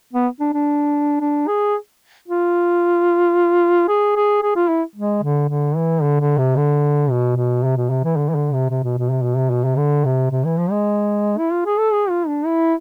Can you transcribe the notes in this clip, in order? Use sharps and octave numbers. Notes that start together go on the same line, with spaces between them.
B3
D4
D4
D4
G#4
F4
G#4
G#4
G#4
F4
E4
G#3
D3
D3
E3
D3
D3
C3
D3
B2
B2
C3
B2
C3
E3
D3
E3
D3
C3
C3
B2
B2
C3
B2
C3
B2
C3
D3
C3
C3
E3
F3
G#3
E4
F4
G#4
A4
G#4
F4
D4
E4